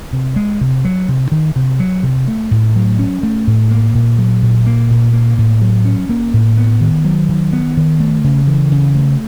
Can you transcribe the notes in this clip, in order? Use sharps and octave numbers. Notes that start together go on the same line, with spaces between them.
C3
G#3
C3
F#3
C3
D#3
C3
F#3
C3
A3
A2
F#3
C#4
A3
A2
A#3
A#2
F#3
A#2
A#3
A#2
A#3
A2
F#3
C#4
A#3
A2
B3
D#3
F#3
D#3
B3
D#3
A3
C#3
E3
C#3
A3